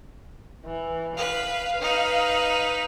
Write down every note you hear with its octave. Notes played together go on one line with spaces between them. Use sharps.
E3
B4 F5
D#4 B4